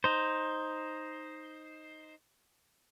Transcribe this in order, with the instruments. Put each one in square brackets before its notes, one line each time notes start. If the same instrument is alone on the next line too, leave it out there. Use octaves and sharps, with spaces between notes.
[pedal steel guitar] D#4 C5